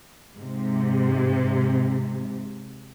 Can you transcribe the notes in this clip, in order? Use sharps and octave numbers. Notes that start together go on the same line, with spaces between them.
G#2 C3